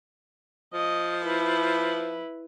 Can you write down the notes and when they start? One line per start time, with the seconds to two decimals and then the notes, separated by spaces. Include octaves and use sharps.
0.73 F3 D#5
1.23 E4 B4